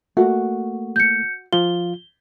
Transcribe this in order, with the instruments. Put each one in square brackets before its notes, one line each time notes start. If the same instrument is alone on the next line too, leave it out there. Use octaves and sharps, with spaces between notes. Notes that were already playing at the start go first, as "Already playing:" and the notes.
[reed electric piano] A3 A#3 [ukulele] F#4
[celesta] G6 C#7
[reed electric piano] F3 F4 [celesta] G7